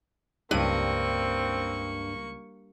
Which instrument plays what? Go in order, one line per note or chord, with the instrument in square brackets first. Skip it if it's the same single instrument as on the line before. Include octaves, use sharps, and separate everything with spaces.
[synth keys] C#2 D#7 [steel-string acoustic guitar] G2 [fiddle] A#3 C#6 [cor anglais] C4